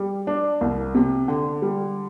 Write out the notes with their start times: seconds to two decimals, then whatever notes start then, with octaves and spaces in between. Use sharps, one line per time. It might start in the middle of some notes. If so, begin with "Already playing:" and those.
Already playing: G3
0.27 D4
0.61 C2
0.95 C3
1.28 D3
1.62 G3